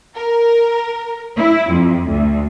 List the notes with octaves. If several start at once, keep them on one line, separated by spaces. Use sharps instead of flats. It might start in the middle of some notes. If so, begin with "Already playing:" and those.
A#4
E4
F2
D2